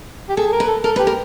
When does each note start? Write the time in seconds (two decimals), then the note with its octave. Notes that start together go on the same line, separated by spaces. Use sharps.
0.30 G4
0.37 G#4 A4
0.53 A#4
0.60 B4
0.68 A4
0.84 A4 A#4
0.96 B4
0.99 G4
1.07 A#4